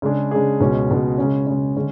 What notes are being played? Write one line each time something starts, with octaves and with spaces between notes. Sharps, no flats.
C#3 G#3 D4 G#4
C#3 G#3 D4 G#4
C#2 B2 G#3 C#4
C#2 B2 G#3 C#4
C#3 G#3 C#4
C#3 G#3 C#4
D3 G#3 C#4